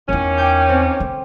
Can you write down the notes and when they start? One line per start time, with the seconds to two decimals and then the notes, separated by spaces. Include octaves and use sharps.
0.09 E2 D#3 A#3 C#4 E4
0.38 G5 D6 G6
0.69 C4
1.00 D3